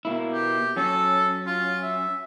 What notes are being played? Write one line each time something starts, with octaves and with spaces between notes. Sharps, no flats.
B2 A#3 E4
G4
F#3 C#4 A4
F4
E5